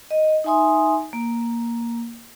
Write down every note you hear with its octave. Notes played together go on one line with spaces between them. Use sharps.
D#5
D#4 E5 G#5 C6 D#6
A#3